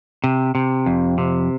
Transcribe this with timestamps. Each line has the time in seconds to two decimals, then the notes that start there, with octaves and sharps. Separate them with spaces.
0.24 C3
0.55 C3
0.86 F2
1.18 C3